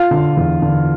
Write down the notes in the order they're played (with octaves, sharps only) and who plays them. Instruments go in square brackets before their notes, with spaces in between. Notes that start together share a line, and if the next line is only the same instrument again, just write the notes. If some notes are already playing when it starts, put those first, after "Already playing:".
Already playing: [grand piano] F4 F5
D3
E2
D3